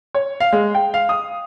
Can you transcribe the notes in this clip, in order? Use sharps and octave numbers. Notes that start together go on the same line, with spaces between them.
C#5
F5
G#3
G5
F5
D#6